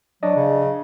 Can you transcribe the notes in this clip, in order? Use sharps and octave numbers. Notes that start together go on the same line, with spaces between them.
F#3 D4 D5 D#5
C#3